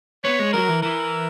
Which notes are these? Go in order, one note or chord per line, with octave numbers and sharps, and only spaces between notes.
B3 C#5
G#3
F#3 A#4
E3
E3 A#4